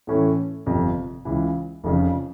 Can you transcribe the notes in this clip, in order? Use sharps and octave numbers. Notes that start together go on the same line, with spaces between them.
A2 E3 A3 C#4
G1 F2 C3
C#2 C#3 E3
F1 F2 C#3